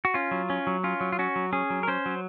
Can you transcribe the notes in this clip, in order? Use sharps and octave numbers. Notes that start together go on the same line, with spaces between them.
F#4
C#4 F4
F#3
C#4
F#3
C#4 F4
F#3
F4
C#4 F#4
F#3
C#4 G#4
F#3
A#4
C#4 C5
F#3